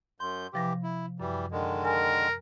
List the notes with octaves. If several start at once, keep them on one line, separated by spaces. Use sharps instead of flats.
F#2 C6 G6
C3 E3 F3 G4 A#6
E4
F#2 E3 G3
D3 D#3 G#3
A#4 G#5